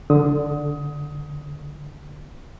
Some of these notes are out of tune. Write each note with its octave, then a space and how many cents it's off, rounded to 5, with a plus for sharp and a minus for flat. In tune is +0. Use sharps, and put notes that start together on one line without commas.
D3 +0 D#6 +20